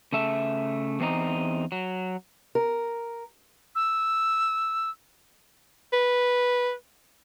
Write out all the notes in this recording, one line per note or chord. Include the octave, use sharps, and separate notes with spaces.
C#3 A3 E5
E2 C4 D#4
F#3
A#4
E6
B4